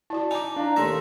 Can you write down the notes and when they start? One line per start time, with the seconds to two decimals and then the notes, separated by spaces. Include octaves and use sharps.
0.10 E4 F#4 D5 A5
0.31 D#4 G#5 D6
0.56 D4 E4 F5 A#5
0.76 D#2 A3 A4 E5 C6 A#6